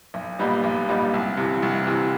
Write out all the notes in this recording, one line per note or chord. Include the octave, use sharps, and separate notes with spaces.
B1
A#2 G3 B3 D#4
B1
A#2 G3 B3 D#4
C2
C3 E3
C2
C3 E3